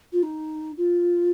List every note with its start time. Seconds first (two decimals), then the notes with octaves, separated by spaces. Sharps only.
0.12 F4
0.22 D#4
0.77 F4